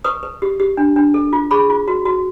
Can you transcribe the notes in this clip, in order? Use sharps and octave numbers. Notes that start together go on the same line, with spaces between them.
B4 C#6 D#6
B4
G4
G4
D4
D4
A4
F4
G#4 B5 C#6
F4
F#4
F#4